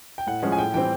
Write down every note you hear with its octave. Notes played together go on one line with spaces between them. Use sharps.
G5
A2 F#5
F3 G#3 C#4
G#5
A2 G5
E3 G3 C4 G5